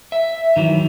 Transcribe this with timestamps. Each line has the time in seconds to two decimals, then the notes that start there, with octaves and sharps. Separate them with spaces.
0.12 E5
0.56 D#3 E3 F#3